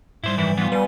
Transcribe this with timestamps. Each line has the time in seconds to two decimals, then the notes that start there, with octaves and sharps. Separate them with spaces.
0.24 G#2 G3 E4 C5
0.38 F#2 D#3 E3 E4
0.57 E3 B3 F4
0.72 G3 B4 G#5